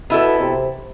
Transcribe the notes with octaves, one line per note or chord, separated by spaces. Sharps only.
B2 B3 E4 A4
C3